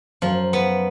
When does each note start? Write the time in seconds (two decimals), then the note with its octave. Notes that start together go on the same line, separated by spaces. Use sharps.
0.22 F#2 F3
0.53 B3